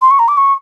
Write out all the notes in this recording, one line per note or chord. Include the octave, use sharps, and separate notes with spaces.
C6
C#6
A#5
D6
C#6